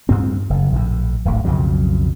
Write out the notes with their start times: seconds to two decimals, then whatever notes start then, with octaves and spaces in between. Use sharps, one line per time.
0.09 D2 G2 C4
0.50 F#1
0.72 A#1 A2
1.25 D1 G#1 D2
1.45 B1 F2 C#3 F#3